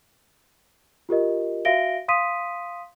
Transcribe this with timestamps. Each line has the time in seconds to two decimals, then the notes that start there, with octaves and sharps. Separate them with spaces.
1.09 F4 G4 A#4 D#5
1.65 F#4 E5 F5 A#6 D7 G7
2.08 F5 C6 D#6 B6 D#7